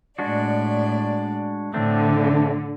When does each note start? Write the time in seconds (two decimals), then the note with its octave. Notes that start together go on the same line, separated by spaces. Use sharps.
0.19 A2 G#3 D4 F#4 D5
1.74 A2 D3 A3 C4 D4